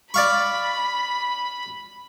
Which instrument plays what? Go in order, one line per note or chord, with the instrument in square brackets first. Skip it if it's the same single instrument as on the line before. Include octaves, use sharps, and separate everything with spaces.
[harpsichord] D5 F5 C#6 [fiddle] B5